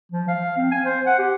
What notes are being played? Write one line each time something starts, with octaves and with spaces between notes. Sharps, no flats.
F3
F5
C4
G#5
C5
F#5
G4